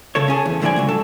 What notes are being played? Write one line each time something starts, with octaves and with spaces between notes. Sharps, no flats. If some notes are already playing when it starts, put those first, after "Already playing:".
C#3 A4 C#5
C#4 G#4 A4
E2
A2 D3 F3 A4 D5 G#5
C#2 F#2 F#3
A4